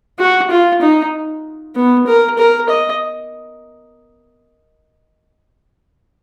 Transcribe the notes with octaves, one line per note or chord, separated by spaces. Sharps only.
F#4
F4
D#4
B3
A#4
A#4
D#5